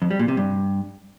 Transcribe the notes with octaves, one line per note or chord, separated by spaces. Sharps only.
F2
G3
A#2
C3
G2